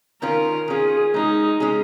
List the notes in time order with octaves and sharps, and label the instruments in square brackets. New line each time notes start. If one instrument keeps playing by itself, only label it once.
[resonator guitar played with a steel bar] D#3 C#4 F4 [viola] A#4
[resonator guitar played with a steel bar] D#3 C#4 F4 [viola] G#4
[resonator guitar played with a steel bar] G#3 C#4 G#4 [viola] D#4
[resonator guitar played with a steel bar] G#3 C#4 G#4